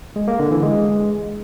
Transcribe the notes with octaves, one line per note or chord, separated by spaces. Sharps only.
G#3
A#3
D3
E3
G#3